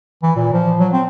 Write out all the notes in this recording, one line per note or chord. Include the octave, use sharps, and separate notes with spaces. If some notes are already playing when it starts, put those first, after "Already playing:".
E3
A#2
F3
F#3
C4